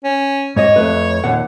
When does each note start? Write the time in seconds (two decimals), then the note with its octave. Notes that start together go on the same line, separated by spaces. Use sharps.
0.04 C#4
0.56 G#2 C#5 D#5
0.76 F2 A3 B4
1.24 D#2 A#2 F#5